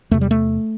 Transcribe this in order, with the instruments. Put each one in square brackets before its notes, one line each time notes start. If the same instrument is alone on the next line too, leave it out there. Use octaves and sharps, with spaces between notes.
[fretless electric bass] E2 C3 A3
G3
A3